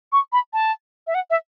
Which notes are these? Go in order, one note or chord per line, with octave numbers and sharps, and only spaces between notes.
C#6
B5
A5
E5
F#5
E5